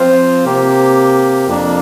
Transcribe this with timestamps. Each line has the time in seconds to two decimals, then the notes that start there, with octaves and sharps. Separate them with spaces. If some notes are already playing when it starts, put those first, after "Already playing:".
Already playing: F3 C4 F4 C5
0.45 C3 A#3 G4
1.47 F2 F3 A#3 D4